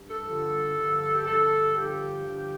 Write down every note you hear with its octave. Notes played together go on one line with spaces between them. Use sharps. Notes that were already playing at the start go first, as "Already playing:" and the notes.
Already playing: G2
A4
G2 D3 F3
G2 D3 F3
G4
G2 D3 F3 A4
G2 D3 F3 G4
G2 D3 F3